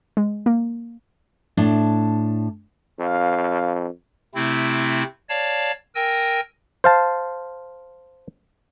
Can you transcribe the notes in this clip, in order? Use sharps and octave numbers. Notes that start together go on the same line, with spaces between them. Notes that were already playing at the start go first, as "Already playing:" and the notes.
G#3
A#3
A2 D4 A5
F2 F5
C3 A3 C4 E4
C#5 D5 F5 A5
A#4 G5 G#5 E6 A#6
C5 F5 A5